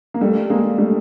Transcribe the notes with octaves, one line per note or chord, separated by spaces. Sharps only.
A#3
G3 A3
G#3 A#3
G3 A3